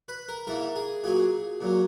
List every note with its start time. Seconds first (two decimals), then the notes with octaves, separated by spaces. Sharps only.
0.08 B4
0.29 A#4
0.47 G#2 E3 A#3 A#4
0.76 G#4
1.04 A#2 F#3 A#3 G#4
1.61 A#2 F#3 A#3